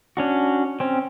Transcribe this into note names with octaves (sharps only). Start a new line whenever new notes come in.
C#4 D4 F#4
C4 C#4